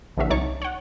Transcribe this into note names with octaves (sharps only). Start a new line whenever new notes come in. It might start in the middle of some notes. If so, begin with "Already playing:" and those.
A#1 C#3 E3 D4 F#4 E5
C2 F#3 D#4 C#5 A5 C#6
C#5 F#5